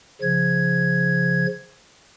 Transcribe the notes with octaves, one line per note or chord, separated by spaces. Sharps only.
C#3 F3 G#6